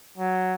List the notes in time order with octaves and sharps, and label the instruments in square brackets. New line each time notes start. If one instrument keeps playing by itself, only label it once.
[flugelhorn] F#3